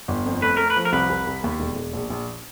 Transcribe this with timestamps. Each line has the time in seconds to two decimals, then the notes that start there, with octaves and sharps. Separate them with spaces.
0.08 G1
0.26 F2
0.42 A3 B4
0.57 A3 A#4
0.70 B4
0.76 F3
0.85 A#4
0.92 C2 B4
1.09 C2
1.27 C2
1.44 D#2
1.60 E1
1.76 E1
1.93 A#1
2.10 A#1